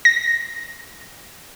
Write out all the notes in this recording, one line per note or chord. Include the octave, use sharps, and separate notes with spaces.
A#6